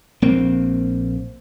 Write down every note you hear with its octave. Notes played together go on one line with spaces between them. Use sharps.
A#1 A#3 C4